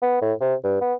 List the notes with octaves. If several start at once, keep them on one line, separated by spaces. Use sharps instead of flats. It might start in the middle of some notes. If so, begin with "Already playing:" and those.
B3
A2
C3
G2
B3